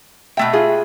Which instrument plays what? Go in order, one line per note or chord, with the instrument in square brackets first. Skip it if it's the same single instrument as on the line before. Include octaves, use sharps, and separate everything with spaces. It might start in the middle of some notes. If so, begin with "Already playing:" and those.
[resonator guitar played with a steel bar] B2 A3 G5 [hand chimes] E5
[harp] F4 G#4